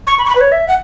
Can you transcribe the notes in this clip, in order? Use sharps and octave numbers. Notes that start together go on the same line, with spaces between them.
C#6
B5
C#6
B5
B4
C#5
E5
F#5